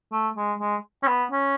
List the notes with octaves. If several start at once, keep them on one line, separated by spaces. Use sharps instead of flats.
A3
G#3
G#3
C#4
B3
C#4